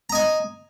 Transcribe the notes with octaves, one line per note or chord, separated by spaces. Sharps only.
D#5 G#5 A#5